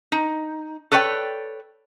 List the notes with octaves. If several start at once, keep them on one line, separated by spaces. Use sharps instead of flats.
D#4
A4 B4 C#5 D5 G5